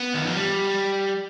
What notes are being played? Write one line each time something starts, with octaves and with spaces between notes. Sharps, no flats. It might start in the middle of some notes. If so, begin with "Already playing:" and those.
Already playing: B3
D#3
F3
G3